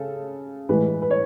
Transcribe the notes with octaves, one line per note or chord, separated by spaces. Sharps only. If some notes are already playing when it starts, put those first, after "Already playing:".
Already playing: C#3 A4
A2 E3 G#3 B4
B4
C#5